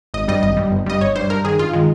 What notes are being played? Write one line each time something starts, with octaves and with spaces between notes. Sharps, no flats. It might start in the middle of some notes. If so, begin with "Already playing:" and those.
G#1 D#5
G2 G3 D#5
G#1 D#5
G2 G3
G1
G2 G3 D#5
G1 C#5
G2 G3 C5
G2 A#4
D#3 G#3 G#4
G2 F4
D#3 G#3